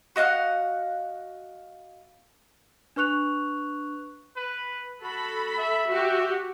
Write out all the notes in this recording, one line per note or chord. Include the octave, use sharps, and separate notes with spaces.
F#4 D#5 F5 F#5
D4 B4 C#6 F#6 F7
B4
F#4 A4 B5
E5
F#4 G4